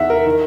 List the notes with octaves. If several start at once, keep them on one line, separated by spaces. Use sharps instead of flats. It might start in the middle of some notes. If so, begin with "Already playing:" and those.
Already playing: E2 D#3 E5 F#5
A#4
D#3